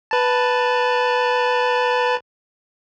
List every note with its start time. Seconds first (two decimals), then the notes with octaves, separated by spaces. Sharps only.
0.11 B4 A5